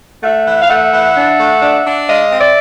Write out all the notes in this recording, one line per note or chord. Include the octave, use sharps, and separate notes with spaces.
A3 E5 F#5
E3
F5
A3 E5 F#5
E3
D4
A3
D4
D4
G#3 D#5 F5
C4
D5 E5